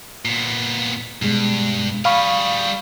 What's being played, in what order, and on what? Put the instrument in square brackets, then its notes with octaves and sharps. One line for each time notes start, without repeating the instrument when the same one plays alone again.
[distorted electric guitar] A#2 B3
[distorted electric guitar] G2 [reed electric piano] B2 G#3
[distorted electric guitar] G3 G#4 [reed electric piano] F5 B5 C#6